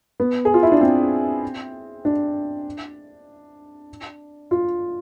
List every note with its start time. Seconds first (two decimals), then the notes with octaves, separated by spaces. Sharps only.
0.20 B3
0.45 G#4
0.54 F4
0.63 E4
0.72 D4
0.81 C4
2.05 D4
4.51 F4